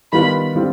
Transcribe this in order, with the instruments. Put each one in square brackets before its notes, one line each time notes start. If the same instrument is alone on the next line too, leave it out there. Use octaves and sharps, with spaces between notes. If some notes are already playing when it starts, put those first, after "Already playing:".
[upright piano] D#3 G3 B3 F4 B4 [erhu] B5
[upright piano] D3 G3 C4 F4